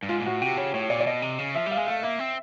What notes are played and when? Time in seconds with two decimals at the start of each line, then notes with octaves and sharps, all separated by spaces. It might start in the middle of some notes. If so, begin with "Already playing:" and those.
0.03 G2
0.09 G#2 F4
0.20 A#2
0.25 A2 F#4
0.42 C3 G4
0.57 C#3 C#5
0.74 A2 C#5
0.90 A#2 D5
1.00 D5
1.07 B2 D#5
1.22 C3
1.38 C#3
1.55 F3 E5
1.66 G3
1.71 F5
1.77 G#3
1.87 A3 F5
2.03 A#3 E5
2.19 C4